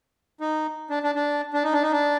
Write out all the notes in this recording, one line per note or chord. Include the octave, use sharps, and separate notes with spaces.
D#4
D4
D4
D4
D4
D#4
D4
D#4
D4